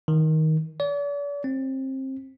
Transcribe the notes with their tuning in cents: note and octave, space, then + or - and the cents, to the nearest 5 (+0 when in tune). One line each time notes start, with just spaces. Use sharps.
D#3 +15
D5 -45
C4 +25